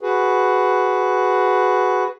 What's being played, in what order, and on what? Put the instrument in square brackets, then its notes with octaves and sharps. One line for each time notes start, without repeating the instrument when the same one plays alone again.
[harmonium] F#4 G#4 B4